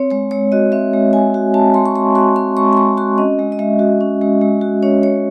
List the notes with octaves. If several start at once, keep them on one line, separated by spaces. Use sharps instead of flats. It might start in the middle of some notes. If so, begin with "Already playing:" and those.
Already playing: C4 C#5
G#3 C#5
G#3 C#5
F#4 D#5
C4 E5
G#3
G#3 G#5
F#4
C4 A5
G#3 C6
C#6
G#3 C6
F#4 C6
C4 C6
G#3 C#6
C6
G#3 C#6
F#4 C6
C#4 D#5
G#3
D#5
G#3 E5
F#4
C#4
G#3
G#3
F#4
C#4 C#5
G#3 C#5